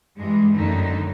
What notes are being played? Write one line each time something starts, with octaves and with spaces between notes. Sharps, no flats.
G2 E3 G#3
F#2 A2 D3 D#3 A3 D#4